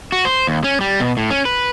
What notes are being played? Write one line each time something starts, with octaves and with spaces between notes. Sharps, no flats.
F#4
C5
D#2
C#4
G3
B2
A2
C#4
B4